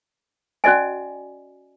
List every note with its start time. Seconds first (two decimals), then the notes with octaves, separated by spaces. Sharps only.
0.64 C#4 F#4 D5 D#5 G#5